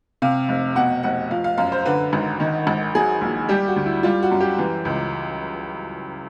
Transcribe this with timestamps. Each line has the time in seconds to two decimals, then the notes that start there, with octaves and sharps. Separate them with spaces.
0.22 C3 F5
0.48 F1
0.76 B2 F#5
1.03 F1 F#5
1.30 F3 F5
1.44 F5
1.58 F#2 F5
1.72 C5
1.85 D3 B4
2.13 G#1
2.40 D#3
2.67 G#1
2.95 F#3 G#4
3.21 A#1
3.49 G3 G4
3.68 F#4
3.76 D2
3.86 E4
4.03 G3 F4
4.23 F#4
4.31 F#2
4.40 G4
4.58 E3
4.85 C#2